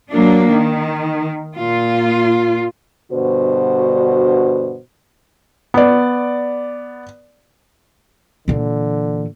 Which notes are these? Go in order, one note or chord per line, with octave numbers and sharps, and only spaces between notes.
F#3 A#3 D4
D#3
A#2 F4
G2 B2 D3 F#4 C5
B3 D5
A#2 D3 E3